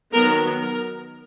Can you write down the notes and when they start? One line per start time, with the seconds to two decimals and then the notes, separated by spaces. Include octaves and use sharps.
0.13 D#3 F#3 B3 A#4
0.61 A#4